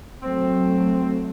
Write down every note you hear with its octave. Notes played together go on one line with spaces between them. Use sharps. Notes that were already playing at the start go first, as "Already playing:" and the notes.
F#3 A3 C4